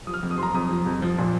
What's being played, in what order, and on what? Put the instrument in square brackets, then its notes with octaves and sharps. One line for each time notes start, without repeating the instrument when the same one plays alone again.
[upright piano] F3 D#6
F6
D#6
F2
D#6
F3 A#5 C6
F2 D#6
F3
F2
F3
A#2